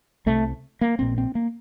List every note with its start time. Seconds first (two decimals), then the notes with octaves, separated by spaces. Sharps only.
0.26 C2 C3 A3
0.81 A#3
0.99 A#1 A#2 C4
1.18 C4
1.35 A#3